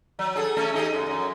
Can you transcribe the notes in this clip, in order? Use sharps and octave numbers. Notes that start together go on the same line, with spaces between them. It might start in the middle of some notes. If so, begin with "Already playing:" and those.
F#3
G#4 A4
A3 C#4 A4
D#4 G4 G#4
F#2
F#2